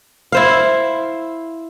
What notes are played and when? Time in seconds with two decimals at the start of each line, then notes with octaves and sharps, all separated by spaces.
0.32 E4 C5 F5